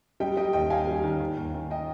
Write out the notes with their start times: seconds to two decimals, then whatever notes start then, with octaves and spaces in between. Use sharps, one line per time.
0.20 G3 D#5 G5
0.37 G3 D#5 G5
0.53 D#2 D#5 G5
0.70 D#2 F5 G#5
0.87 G3
1.04 D#3
1.20 D#3
1.37 D#2
1.54 D#3
1.71 D#5 G5